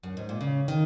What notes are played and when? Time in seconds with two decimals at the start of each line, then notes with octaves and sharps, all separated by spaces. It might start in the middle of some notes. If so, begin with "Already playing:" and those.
0.03 F#2
0.17 G#2
0.29 A#2
0.41 C#3
0.68 D#3